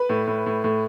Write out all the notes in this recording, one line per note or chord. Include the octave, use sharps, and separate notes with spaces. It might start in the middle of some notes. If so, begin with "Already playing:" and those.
Already playing: B4
A2
A2
A2
A2